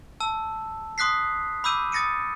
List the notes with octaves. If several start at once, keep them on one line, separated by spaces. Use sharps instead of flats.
A5 E6
C6 D#6 F#6 B6 C7
B5 D6 E6 G6 D#7
D#6 A6 A#6 C#7 D#7